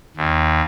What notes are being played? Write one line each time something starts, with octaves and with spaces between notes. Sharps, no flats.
D#2